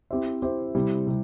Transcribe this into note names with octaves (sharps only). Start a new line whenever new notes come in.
C4 E4 G4 C5 E5
C4 E4 G4 C5 E5
C3 G3 C4 E4
C3 G3